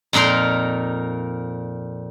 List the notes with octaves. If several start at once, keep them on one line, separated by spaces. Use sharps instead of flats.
F2 A#2 D#4 A#4 C6